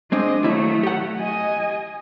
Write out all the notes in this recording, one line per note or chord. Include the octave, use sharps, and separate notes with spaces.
G#3 C4 D4 D#5
D#2 F#3 A3 E4 E5
G4 F#5
D#5 G#5